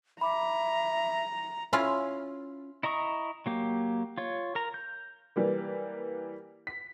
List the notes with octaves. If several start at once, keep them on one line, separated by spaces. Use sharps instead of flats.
E5 A#5 B5 D6
C#4 E4 F4 F5
E4 D#5 A#5 C#6 D#6
F#3 A#3 G4
F4 C#5
A#4 A#5
G6
E3 G3 A#3
B6